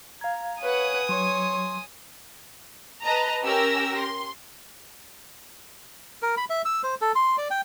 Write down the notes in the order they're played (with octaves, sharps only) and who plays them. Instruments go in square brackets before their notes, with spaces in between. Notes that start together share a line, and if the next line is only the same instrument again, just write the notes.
[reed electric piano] F5 G#6 [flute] A#5
[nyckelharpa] B4 F#5 [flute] C#5 [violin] G#5 D#6
[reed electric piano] F#3 [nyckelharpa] C#5 [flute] C6
[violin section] B4 D#5 A5 A#5
C#4 G4 A#4 E6 A#6
C6
[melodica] A#4
B5
E5
E6
C5
A4
C6
D5
G5